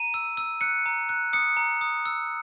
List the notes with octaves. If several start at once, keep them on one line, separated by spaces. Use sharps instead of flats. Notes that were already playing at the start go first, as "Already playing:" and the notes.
Already playing: A#5 D#7
E6
E6
F#6 C#7
A#5
F#6
D#6 C#7
A#5
D#6
E6